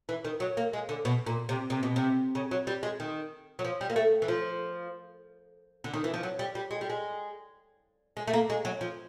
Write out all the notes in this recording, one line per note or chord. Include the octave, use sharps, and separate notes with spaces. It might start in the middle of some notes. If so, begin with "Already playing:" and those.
E3
D#3
F#3
A#3
G#3
D3
B2
A#2
C3
C3
B2
C3
C#3
F#3
G3
G#3
D#3
F#3
F3
G3
A#3
A3
E3
F3
D3
D#3
E3
F3
F#3
G3
G3
G#3
G3
G#3
G#3
A3
A#3
G#3
F#3
F3